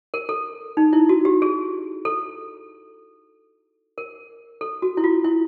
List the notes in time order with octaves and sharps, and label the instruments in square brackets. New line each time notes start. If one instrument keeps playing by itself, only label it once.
[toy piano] A#4
A4
D#4
E4
F#4
G4
G#4
A4
A#4
A4
F#4
E4
F4
E4